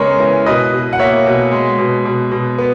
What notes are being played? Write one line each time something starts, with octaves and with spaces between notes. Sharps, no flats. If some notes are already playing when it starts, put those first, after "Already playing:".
Already playing: C#3 G#3 B3 A#4 C#5
E3
B2 B4 D#5
B2
F#5
A#3 C#5 E5
B2
G#3
B2
B2
B2
B3